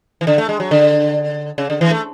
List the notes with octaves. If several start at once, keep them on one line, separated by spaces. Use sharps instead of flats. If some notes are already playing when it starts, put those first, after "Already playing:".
E3
D3
A3
G#3
F#3
D3
C#3
D3
E3
A3